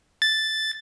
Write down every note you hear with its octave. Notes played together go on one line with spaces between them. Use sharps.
A6